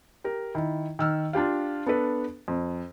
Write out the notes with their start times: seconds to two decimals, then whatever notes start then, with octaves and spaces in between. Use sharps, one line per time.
0.24 G4 A#4
0.55 D#3 E4
0.99 D#3 E6 F6
1.33 D4 F4 G4 F5
1.86 B3 D4 A4 B4
2.48 F2